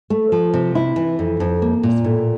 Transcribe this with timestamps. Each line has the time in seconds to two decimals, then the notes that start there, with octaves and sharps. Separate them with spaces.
0.10 A3
0.32 F3
0.54 C3
0.75 E4
0.96 E3
1.19 F2
1.40 F2
1.62 A#3
1.83 A#2
2.04 A2